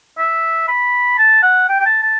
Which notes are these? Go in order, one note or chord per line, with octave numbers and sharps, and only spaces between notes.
E5
B5
A5
F#5
G5
G5
A5
A5